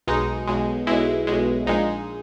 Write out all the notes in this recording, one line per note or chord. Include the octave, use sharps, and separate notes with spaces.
B1 B2 G#3 D#4
B1 B2 G#3
B1 B2 G#3 E4
B1 B2 G#3
A#1 A#2 G#3 D#4